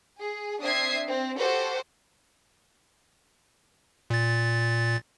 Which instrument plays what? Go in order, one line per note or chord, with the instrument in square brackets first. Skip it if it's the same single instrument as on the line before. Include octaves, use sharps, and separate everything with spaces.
[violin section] G#4
C4 D4 E5 D#6 G#6 C7
C4
F#4 G4 A4 C5 F#5
[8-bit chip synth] A#2 A6